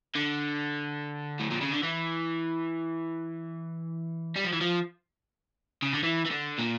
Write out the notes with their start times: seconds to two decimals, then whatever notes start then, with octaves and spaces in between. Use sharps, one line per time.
0.15 D3
1.39 A2
1.51 A#2
1.61 C#3
1.72 D3
1.83 E3
4.36 G3
4.44 F3
4.53 E3
4.61 F3
5.82 C#3
5.93 D3
6.03 E3
6.26 E3
6.31 D3
6.59 A#2